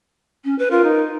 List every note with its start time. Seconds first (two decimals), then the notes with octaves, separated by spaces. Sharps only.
0.44 C#4
0.59 B4
0.71 F4 A#4
0.84 D#4